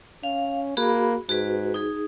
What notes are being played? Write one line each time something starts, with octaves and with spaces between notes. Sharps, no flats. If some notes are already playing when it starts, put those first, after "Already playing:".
C#4 F5
A#3 F#4 G#4 B5
G#2 F#4 G#4 B4
D#4 G#4